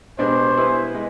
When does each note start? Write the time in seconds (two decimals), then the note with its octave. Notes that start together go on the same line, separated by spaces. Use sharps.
0.19 B2 G#3 B3 D4 G4 C5
0.57 G3 B3 E4 G#4 B4
0.95 G#3